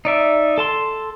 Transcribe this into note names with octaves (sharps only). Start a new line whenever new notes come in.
D#4 D5 E5
A4 A5 C6